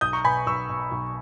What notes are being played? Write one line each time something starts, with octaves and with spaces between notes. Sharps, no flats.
B1 D#6 G6
A#5 C#6
B2 G#5 B5
B1 C#6 E6
B2
B1